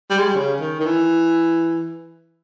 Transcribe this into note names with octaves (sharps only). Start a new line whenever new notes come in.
G3
G#3
G3
C#3
D#3
D#3
E3